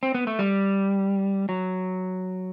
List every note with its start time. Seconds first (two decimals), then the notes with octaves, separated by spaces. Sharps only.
0.03 C4
0.15 B3
0.27 A3
0.39 G3
1.49 F#3